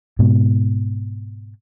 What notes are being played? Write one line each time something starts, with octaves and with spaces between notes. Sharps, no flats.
G#2 B2